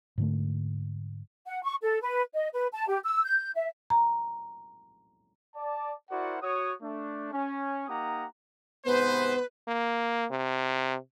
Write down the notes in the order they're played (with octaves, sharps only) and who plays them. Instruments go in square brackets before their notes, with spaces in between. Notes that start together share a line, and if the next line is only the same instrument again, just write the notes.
[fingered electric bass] G#2 D3 A3
[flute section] F#5
C#6
A4
B4
D#5
B4
A5
G4
E6
G6
E5
[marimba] A#5
[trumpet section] D5 A5
E4 F#4 A#4 C5 D5 F#5
F#4 C#5 D#6
A3 D4
C#4
A#3 D#4 G4 F#5 A#5 D#6
[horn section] G#2 C3 C5 [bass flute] B3 [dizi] B4
[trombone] A#3
C3